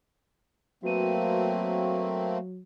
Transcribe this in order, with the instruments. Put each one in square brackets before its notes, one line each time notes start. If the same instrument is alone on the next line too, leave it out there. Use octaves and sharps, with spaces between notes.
[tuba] F#3 [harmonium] A3 A#3 C4 [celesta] F#4 B4 D#7